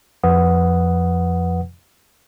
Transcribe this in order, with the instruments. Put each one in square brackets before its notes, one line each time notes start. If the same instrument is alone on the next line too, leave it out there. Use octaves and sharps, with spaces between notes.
[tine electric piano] F2 F3 B4 F#5 D#6